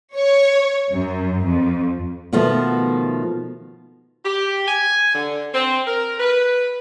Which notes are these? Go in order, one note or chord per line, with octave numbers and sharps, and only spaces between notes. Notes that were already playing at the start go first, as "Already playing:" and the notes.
C#5
F#2
F2
B2 D#3 F3 A3 B3
G4
G#5
D3
C4
A#4
B4